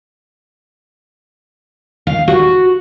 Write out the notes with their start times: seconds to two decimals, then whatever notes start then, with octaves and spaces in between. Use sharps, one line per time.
2.07 F5
2.28 F#4